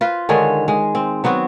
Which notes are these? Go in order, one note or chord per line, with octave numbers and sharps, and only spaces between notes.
F4 B4 C5
D3 D#3 G#3 C#5
G#3
C4
F#3 B3 C4 F#4